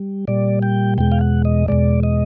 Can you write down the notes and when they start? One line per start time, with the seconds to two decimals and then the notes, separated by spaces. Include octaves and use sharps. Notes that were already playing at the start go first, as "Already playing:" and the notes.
Already playing: G3
0.28 A#2 G3 D5
0.62 G5
0.98 E2 B2 G#3 G5
1.12 F5
1.21 F#5
1.45 D#5
1.68 E2 B2 G#3 D5
2.03 D#5